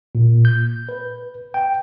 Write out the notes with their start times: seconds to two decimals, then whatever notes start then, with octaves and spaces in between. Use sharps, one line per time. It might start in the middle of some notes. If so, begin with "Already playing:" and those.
0.15 A#2
0.45 G6
0.89 B4
1.54 G5